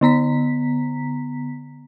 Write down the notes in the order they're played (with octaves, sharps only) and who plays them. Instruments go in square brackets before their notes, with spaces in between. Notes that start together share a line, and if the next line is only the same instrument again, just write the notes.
[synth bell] D3 B3 A#5 B6